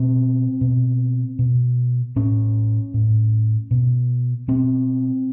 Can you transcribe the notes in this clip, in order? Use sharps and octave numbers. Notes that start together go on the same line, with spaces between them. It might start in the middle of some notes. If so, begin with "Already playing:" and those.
Already playing: B2 C4
B2
B2
A2 C#4
A2
B2
B2 C4